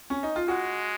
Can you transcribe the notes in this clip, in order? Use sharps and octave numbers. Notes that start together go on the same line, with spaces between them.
C#4
D#4
F4
G#3 F#4